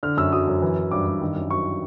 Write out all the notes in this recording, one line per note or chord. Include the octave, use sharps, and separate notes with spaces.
D3 F6
F#2 E6
F#3 D#6
F#2
E3
E3
G2 D6
G2
D#3
F#2
F#3 C#6